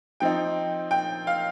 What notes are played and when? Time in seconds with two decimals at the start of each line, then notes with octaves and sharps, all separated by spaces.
0.20 F3 C4 D#4 G5
0.91 G5
1.27 F5